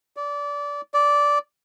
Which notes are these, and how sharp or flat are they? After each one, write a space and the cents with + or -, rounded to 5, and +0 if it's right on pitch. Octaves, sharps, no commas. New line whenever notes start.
D5 -25
D5 -10